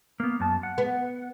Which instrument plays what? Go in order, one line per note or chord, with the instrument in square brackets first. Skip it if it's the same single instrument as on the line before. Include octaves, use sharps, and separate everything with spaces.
[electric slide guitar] A#3 B3
F#2 A5
F#5
[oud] B3